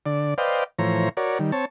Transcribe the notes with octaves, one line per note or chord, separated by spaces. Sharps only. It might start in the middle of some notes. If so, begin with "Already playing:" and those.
D3 D5
B4 C5 D5 D#5 F5 G5
A2 E3 F3 C5 C#5 A#5
F#4 A#4 C#5 D5
D#3 G3
C4 C#5 A5